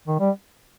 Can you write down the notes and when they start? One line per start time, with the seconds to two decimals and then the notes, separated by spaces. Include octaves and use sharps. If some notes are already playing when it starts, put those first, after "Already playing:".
0.08 D#3
0.20 G3